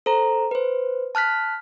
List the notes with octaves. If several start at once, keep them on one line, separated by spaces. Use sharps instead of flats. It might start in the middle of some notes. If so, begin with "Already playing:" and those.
A4 C5 A#5
B4 C5
A5 F6 F#6 B6